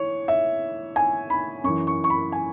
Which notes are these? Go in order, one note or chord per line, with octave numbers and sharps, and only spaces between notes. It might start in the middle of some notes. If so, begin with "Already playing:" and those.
Already playing: E3 C#5
E5
G#5
B5
F#2 E3 C#6
C#6
C#6
B5
G#5